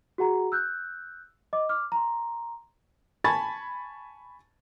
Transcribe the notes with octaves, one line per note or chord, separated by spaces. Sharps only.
F#4 G#4 F#5 A#5
E6 F#6 G6
D#5 D6
D6 F6
A#5 C6
G#5 A5 B5 C#6 G#6 A6